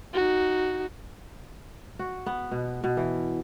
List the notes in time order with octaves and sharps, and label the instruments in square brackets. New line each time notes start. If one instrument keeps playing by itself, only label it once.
[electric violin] D#4 F#4
[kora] F#4
B3
B2
B2
E3